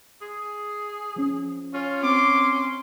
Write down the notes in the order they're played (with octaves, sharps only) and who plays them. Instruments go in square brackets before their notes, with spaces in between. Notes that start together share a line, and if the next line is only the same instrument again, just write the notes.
[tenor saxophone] G#4
[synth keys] F3 C#4
[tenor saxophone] C#4 [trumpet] F4
[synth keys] C4 [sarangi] C6 [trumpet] D6